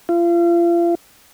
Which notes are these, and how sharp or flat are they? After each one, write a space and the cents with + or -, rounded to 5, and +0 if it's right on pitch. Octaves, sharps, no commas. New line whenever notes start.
F4 -35